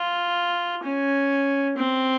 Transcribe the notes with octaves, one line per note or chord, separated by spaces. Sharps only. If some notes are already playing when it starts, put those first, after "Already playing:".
Already playing: F4
C#4
C4